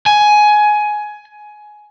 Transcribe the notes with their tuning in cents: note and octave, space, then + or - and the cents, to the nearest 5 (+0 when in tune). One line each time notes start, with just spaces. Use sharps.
G#5 +15